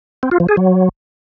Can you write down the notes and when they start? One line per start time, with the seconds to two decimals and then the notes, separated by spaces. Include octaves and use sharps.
0.23 C4
0.31 F4
0.40 F3
0.49 G#4
0.57 F#3